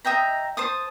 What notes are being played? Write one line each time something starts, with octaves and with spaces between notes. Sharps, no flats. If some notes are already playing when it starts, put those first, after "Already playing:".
D#5 E5 G5 A#5
C5 A5 D#6